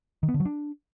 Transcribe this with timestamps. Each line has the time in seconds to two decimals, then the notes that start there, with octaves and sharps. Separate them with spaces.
0.23 D#3
0.29 B3
0.34 D3
0.40 F#3
0.45 D4